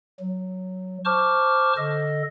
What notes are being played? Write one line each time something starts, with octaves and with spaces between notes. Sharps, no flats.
F#3
C5 A5 C#6 D6 F6
D3 A4 D#5